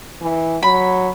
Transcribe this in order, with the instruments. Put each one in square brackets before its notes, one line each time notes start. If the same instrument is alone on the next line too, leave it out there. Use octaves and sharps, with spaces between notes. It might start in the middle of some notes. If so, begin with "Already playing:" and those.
[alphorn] E3
[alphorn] F#3 [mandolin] B5